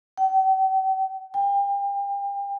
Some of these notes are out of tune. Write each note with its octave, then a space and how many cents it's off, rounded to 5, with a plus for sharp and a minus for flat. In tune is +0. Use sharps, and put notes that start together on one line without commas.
G5 -45
G5 +35